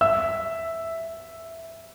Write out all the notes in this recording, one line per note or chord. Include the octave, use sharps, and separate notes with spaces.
E5 E6